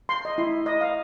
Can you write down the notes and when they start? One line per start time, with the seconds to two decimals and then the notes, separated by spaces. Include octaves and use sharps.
0.09 C6
0.25 D#5
0.38 E4
0.66 D#5
0.81 F5